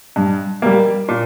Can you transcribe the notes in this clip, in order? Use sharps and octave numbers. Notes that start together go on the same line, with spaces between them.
G2
G3 A#3
A#2